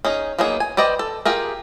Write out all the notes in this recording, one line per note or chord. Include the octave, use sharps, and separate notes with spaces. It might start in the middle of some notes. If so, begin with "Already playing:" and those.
C#4 D#4 G#4
F#3 A#3 B3 D#4 G#4
G#5
B4 C5 D5 D#5 G5
A4
F4 G4 G#4 A#4